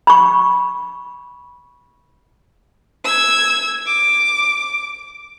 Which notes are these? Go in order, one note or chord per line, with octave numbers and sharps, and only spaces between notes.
B5 C#6
E6 G#6
D6